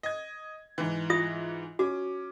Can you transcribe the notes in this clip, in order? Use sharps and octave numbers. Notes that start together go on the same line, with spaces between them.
D#5 G#6
G#2 E3
F4 E5 D#6
C#4 F#4 D6